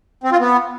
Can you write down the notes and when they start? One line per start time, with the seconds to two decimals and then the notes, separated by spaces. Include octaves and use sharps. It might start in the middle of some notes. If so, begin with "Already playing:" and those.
0.24 C4
0.32 F4
0.40 B3